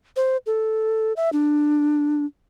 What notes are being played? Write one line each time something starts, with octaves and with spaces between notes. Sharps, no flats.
C5
A4
E5
D4